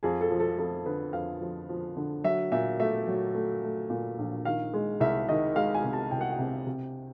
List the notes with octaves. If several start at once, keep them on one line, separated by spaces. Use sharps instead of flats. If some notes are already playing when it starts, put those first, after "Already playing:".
F2 G#4
A4
F3
A4
F2 A4
D3 B4
F2 F5
F3
F3
D3
F#3 E5
A#2 E5
A3 E5
F#3
A3
A3
A#2
A#1
D#3 F5
G#3
C2 E5
D#3 D#5
G#3 F5
G#5
C3
A5
C2 G5
F#5
G5
C3
C3